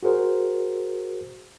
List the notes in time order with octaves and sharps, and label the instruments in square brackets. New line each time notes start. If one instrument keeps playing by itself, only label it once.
[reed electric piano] F#4 G#4 A#4 C5